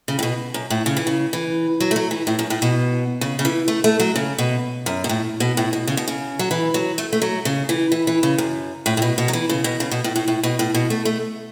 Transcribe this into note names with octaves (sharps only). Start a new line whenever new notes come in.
C#3
A2
B2
F#2
A2
C#3
E3
C#3
E3
F#3
A3
F#3
E3
A2
F#2
A2
B2
C#3
C#3
E3
A3
A3
F#3
C#3
B2
F#2
B2
A2
B2
A2
B2
C#3
B2
C#3
F#3
E3
F#3
A3
A3
F#3
C#3
E3
E3
E3
C#3
F#2
A2
A2
B2
B2
F#3
E3
C#3
B2
C#3
B2
A2
A2
A2
B2
A2
B2
A3
A3